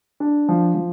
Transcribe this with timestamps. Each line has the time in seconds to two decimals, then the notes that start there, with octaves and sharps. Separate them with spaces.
0.20 D4
0.49 F3
0.75 F3